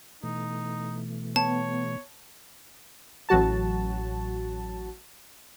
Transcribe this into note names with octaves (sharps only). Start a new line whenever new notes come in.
B2 E3 A3 D#4
B3 C#5 A5
A1 F#3 F#4 A5